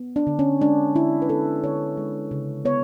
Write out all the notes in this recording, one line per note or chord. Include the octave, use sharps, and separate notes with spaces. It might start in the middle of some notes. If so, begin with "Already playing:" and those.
Already playing: B3
D4
D3
C#4
G#3 D4
D3 E4
B4
B3 A4
D3 C#5
G#3
C#3
B3 C#5